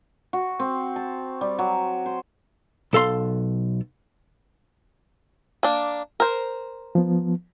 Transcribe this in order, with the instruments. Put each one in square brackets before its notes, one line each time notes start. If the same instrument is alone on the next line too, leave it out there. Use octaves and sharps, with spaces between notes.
[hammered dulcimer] F#4
C4
A5
G3
F#3
C5
[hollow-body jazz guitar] B1 A4 F5 C6
[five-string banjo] A#3 D4
A#4 C5
[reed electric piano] F3 B3